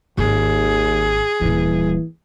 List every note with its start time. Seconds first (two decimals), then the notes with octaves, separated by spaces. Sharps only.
0.18 G#1 D#2 G#4
1.41 D#1 E3 G3